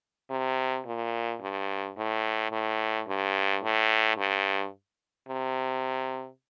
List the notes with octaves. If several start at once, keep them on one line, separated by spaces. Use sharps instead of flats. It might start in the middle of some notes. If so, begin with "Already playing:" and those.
C3
A#2
G2
A2
A2
G2
A2
G2
C3